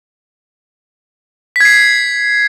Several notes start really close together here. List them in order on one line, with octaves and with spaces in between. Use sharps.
B6 G#6 C7